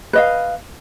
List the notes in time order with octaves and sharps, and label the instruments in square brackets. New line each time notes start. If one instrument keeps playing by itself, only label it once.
[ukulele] B4 D#5 F5